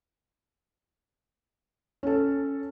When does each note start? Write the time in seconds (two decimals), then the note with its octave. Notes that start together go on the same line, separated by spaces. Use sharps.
2.03 C#4 A4